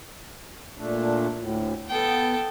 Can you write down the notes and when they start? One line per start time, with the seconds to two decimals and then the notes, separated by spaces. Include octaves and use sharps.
0.78 A#2 A3 D4
1.39 D2 A2
1.89 B3 A4 G5